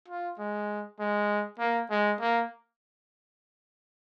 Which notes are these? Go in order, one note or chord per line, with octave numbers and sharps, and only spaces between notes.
F4
G#3
G#3
A#3
G#3
A#3